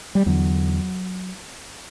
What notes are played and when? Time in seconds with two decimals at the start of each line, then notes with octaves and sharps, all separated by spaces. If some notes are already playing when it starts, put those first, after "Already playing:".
0.15 G3
0.26 E2 D3 F#3